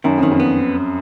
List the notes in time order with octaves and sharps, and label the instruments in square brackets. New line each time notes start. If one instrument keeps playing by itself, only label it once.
[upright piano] F#2 [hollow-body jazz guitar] D#3
[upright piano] F2
[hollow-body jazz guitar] D#3
[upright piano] F2
[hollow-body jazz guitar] B3